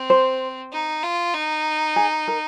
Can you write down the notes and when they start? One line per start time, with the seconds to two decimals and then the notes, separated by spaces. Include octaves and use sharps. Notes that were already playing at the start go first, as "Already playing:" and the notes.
Already playing: C4
0.10 C5
0.73 D#4
1.03 F4
1.34 D#4
1.96 G#4
2.28 A#4